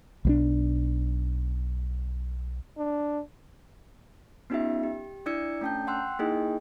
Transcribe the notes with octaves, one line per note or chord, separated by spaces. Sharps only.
B1 F#3 D4
D4
B3 C#4 D#4 F4 G4 E5
G4
D4 E4 D5 E6 G#6 C#7
A3 C#4 D4 G5 A5 G6
F#5 G5 C6 E6 F#6
A#3 D#4 E4 G#4 D#5 G5